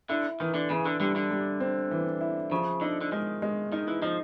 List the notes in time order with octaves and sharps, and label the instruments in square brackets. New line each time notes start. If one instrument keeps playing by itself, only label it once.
[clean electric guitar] D3 [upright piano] E4
[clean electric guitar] D#3 [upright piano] E3
[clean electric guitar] D3
[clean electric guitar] C#3 [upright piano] E3
[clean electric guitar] D3
[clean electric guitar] D3 [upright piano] G3
[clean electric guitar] D3
[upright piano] G3
C4
E3
E4
[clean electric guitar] C#3 [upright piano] F3
[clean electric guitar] D3 [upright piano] D#4
[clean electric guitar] D3
[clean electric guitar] D#3 [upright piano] G#3
[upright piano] G#3
[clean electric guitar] D#3 [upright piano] D#4
[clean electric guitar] E3
[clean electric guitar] F3 [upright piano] D#4